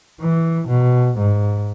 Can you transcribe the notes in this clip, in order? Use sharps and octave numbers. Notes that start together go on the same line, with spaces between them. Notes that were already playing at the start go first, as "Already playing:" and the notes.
E3
B2
G#2